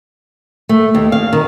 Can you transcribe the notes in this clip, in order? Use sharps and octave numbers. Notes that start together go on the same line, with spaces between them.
A3
D#2
F5
D#3